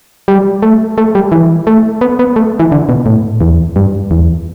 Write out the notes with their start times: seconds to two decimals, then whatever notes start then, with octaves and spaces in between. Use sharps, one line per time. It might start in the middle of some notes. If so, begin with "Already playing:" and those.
0.28 G3
0.62 A3
0.98 A3
1.15 G3
1.32 E3
1.67 A3
2.01 B3
2.19 B3
2.36 A3
2.60 E3
2.72 D3
2.89 B2
3.06 A2
3.41 E2
3.76 G2
4.11 E2